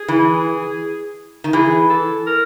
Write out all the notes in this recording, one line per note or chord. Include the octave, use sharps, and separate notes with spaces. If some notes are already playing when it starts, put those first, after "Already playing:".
Already playing: G#4
E3
D#3
E3 G#4
A4
A#4